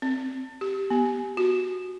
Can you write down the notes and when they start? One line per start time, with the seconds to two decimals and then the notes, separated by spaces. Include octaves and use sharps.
0.02 C4
0.61 G4
0.90 B3
1.37 F#4